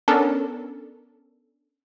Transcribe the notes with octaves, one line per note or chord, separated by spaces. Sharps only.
B3 C#4 D4 A4 A#4